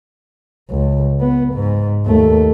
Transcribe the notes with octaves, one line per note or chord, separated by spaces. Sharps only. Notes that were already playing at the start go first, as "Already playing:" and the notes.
C#2
B3
G#2
D#2 A3